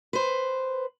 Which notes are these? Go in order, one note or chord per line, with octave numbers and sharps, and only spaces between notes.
B4 C5